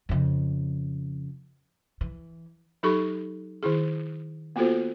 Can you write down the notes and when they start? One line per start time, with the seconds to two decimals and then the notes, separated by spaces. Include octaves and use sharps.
0.09 F2 C#3
2.01 E3
2.83 F#3 D#4 G4 A4 B5 C#6
3.63 D#3 E4 G#4
4.56 A#3 B3 F4 F#4 A4 C5